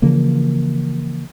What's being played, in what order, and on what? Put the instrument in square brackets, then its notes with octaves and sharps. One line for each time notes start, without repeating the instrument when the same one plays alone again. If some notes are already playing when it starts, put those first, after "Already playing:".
[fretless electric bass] C#3 E3 F3 A#3